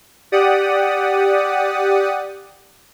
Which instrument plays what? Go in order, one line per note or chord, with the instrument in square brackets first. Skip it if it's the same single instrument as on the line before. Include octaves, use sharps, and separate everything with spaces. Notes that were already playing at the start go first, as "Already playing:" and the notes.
[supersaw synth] G4 D5 F#5 D#6